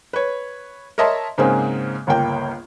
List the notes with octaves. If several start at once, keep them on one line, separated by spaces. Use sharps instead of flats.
B4 C#5
A#4 C#5 D#5 E5 A5 C6
G#2 C#3 G#3 A#3 C4 G#4
G1 C#2 A#3 G5